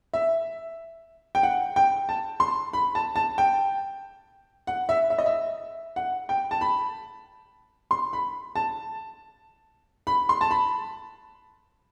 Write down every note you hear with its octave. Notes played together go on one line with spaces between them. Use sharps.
E5
G5
F#5
G5
A5
C6
B5
A5
A5
G5
F#5
E5
E5
D#5
E5
F#5
G5
A5
B5
C6
B5
A5
B5
C6
A5
B5